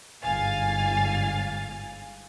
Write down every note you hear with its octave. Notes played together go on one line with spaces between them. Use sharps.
G1 G#2 F5 G#5 A6